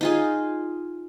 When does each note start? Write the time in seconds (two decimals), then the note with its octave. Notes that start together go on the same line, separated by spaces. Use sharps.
0.01 D#4 F4 G#4